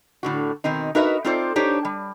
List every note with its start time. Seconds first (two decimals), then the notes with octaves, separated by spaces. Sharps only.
0.23 A2 D3 F#4
0.64 B2 D#3 C4 D#4
0.95 D#4 F#4 A#4 B4 D#5 E5
1.24 C4 D#4 F4 A4 C5 D5
1.56 D4 D#4 G4 C5 C#5
1.85 G3